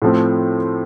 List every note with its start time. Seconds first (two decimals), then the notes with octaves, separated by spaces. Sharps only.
0.02 A2 F3 A3 C4